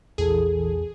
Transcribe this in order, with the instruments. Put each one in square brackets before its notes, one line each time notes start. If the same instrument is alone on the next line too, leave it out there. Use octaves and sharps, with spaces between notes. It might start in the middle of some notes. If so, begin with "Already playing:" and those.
[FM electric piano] A#1 E3 A4 [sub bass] E2 [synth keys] G#4